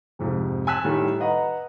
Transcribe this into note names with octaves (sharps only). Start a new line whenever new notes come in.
F2 G#2 C3
G#5 A5 E6 F#6 B6 E7
A2 D#3 G3 A3
B4 D#5 F#5 A#5